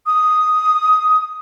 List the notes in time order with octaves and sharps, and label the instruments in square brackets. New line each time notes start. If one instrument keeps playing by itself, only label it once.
[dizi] D#6